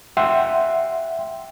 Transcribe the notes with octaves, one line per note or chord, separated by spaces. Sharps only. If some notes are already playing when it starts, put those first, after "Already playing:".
E5 F#5 G5 C6